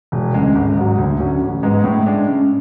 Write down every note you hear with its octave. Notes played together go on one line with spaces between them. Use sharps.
E1
D2 C#3 G#3
G#1
G#2 F#3
D2
D3 F#3 C#4
A1
G#2 G#3 B3
A2
G#3 D4
C#3